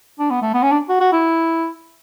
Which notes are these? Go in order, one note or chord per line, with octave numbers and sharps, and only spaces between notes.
D4
B3
A3
B3
C#4
D4
F#4
F#4
E4